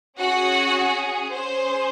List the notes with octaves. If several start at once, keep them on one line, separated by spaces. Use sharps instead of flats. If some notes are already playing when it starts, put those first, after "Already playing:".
C#4 F#4 G#4 F#5
C#4 G#4 C5